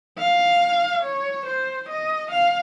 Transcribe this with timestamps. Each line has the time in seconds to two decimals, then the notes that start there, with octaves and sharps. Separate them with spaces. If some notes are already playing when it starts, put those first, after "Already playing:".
0.18 F5
1.03 C#5
1.46 C5
1.89 D#5
2.31 F5